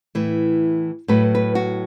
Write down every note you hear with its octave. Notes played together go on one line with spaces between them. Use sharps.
A2 E3
A2 F#3 B4
B4
F#4